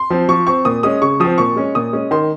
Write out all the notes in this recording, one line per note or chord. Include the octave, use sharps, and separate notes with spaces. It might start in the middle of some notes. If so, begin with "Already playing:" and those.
Already playing: C6
F3 C4
F3 C#6
C4 C#6
A#2 D#6
G#3 C#4 D#6
C#3 C#6
F3 C4 D#6
A#2 C#6
G#3 C#4
A#2 D#6
G#3 C#4
D#3 C6